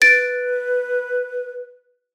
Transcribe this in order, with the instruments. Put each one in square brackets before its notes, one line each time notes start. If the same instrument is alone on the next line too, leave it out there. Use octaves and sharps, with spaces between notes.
[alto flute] B4 [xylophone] A6 D7